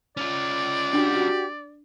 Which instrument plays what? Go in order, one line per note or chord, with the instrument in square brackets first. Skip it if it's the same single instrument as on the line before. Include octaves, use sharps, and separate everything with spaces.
[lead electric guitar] C#4 F4 [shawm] D5
[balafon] D4 [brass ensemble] F#4 G4